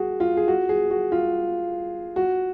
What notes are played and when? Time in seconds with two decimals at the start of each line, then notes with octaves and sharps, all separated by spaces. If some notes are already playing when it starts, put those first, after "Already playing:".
Already playing: F#4 G#4
0.20 F4
0.37 G#4
0.48 F#4
0.69 G#4
0.90 F#4
1.12 F4
2.16 F#4